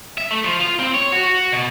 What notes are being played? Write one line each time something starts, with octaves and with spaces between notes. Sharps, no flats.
E5
A3
F3
F4
C4
C#5
F#4
F#4
B2